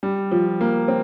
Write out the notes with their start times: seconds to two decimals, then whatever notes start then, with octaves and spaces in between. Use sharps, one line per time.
0.03 G3
0.32 F3
0.61 A#3
0.88 C4